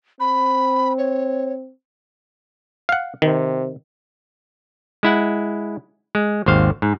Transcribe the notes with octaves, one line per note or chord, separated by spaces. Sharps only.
C4 B5
C#5
F5 F#5
C3 D#3
G#3 E4 F#5
G#3
G#1 D#2 C5 F5
G#2